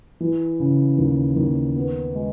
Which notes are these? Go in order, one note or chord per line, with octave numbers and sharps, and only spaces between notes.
E3
C#3
D#2
D#2
B3
G#3